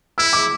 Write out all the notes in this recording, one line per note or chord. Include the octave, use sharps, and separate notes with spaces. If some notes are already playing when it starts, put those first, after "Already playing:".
E4 E6
D6